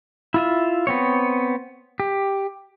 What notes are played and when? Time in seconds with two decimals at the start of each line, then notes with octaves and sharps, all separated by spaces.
0.34 E4 F4 E5
0.87 B3 C4 C#5
2.00 G4